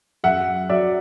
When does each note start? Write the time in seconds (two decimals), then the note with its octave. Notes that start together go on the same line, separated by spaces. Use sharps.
0.24 F#2 E5 F#5
0.70 F#3 D5 E5